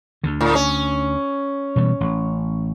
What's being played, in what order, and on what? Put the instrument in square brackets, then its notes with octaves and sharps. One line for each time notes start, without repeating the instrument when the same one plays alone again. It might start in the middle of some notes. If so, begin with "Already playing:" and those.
[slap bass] D2 D3
[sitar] A2
C#4
[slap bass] B2 E3 G3
A1